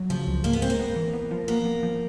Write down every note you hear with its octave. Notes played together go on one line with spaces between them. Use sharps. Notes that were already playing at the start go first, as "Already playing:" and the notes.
Already playing: F#3
C#3 F3
C#2
G#2 A#3
B3
G#3 C4
A#3
B3
E3
B3
F3
A#3 B3
B3
F3